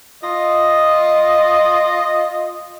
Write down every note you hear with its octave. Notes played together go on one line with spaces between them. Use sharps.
F4 D#5